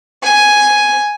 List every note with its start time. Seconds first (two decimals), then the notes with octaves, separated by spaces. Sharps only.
0.23 G#5